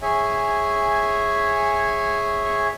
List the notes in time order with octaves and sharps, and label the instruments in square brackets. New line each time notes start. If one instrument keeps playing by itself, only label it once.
[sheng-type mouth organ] G#4 C#5 E5 G#5